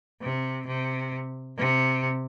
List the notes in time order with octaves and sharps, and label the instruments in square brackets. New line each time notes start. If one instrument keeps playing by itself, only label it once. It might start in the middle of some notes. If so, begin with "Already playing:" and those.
[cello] C3
C3
C3